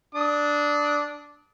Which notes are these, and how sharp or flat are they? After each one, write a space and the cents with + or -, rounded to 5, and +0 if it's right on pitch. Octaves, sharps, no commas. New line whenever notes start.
D4 +0 D#6 +35